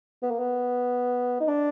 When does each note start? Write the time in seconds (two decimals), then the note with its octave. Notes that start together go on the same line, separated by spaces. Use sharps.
0.23 B3
0.31 A#3
0.39 B3
1.40 D#4
1.48 D4